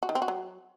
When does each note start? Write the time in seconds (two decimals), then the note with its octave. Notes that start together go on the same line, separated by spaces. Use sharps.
0.03 F#4
0.09 D#3
0.15 C4
0.22 F#4
0.28 F#3